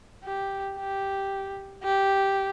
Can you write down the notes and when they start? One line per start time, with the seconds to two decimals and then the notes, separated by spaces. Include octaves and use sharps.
0.24 G4
0.77 G4
1.84 G4